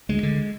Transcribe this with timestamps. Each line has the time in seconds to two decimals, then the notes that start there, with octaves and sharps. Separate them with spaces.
0.09 D2 G#3
0.23 D3